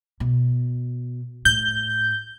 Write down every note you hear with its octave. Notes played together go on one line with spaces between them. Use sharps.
B2
A2 G6